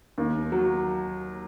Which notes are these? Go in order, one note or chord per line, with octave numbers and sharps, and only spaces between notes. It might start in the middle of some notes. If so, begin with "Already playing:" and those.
D#2
F#3